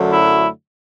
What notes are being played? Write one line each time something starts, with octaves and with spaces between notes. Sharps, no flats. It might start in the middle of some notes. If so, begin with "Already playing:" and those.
Already playing: F#2 D3 F#3 A3 D4
E4